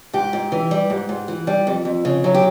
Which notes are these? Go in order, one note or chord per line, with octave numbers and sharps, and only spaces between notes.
G#2 G4
G#2
E3
G3
G#2
G#2
E3
G3
F2
F2
C#3
F#3
G4